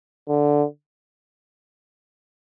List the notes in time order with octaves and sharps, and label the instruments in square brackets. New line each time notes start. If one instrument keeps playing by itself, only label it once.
[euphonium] D3